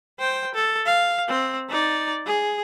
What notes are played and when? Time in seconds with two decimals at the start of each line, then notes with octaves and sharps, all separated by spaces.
0.19 C5 G5
0.55 A4
0.86 F5
1.28 C4
1.70 D#4 D5
2.26 G#4